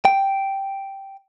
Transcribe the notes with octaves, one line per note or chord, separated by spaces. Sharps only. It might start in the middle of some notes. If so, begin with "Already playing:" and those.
G5